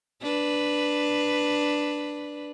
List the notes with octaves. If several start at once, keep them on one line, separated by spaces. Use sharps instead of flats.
D4 B4